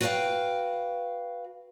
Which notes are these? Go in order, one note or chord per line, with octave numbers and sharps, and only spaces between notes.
F#4 B4 D5 D#5 F5 G5